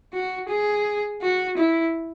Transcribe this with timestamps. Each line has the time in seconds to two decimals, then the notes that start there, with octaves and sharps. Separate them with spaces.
0.13 F#4
0.49 G#4
1.22 F#4
1.57 E4